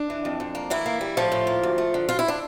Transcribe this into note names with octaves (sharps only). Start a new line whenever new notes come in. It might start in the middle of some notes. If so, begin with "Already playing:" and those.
Already playing: D4
E3
F2
F2
A#3
A2 E3 E4
A#3
G3
A2 F3 F4
A2
A#3
D2
A3
D3
D2 F4
E4
D4